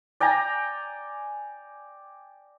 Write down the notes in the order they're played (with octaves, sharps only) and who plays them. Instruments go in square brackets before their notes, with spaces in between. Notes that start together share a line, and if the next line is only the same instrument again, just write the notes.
[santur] D5 G5 G#5 A#5